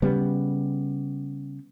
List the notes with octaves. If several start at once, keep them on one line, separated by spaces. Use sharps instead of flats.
C#3 G3 B3